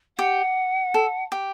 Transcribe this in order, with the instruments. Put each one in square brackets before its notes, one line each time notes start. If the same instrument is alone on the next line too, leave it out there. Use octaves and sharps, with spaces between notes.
[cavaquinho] G4 [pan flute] F#5
[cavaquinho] A4
G4